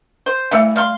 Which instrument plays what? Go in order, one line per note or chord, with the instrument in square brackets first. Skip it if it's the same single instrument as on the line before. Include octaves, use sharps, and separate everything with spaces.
[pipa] C5
[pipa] E3 G3 [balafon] A3 E5
[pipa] G3 F5 C6